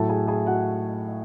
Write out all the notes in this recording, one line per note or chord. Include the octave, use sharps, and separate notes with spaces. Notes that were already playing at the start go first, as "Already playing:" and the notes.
Already playing: A2 F#3 A3 A4 A5
G#4 G#5
G#4 G#5
F#4 F#5